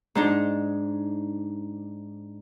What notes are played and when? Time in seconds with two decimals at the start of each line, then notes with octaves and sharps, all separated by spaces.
0.15 G#2 D4 D#4